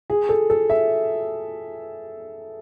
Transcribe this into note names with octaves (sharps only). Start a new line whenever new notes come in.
G#4
A4
A4
E5